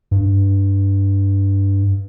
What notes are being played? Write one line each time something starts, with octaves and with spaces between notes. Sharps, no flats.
G2